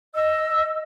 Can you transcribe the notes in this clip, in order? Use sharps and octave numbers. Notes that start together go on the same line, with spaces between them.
D#5 E6